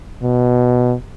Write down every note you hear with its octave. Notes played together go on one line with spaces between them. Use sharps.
B2